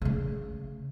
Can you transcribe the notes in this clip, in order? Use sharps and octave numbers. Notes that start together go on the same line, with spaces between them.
C#3 A3